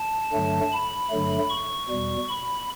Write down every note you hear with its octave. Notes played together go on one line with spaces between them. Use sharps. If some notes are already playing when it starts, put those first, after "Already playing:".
Already playing: A5
G2 D3 F#3 A3
B5
G2 D3 F#3 A3
C#6
E2 B2 G3
B5